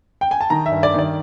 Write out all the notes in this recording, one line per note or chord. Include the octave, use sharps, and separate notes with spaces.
G5
G#5
A5
D#3 A#5
E5
G2
D5
D#3 D5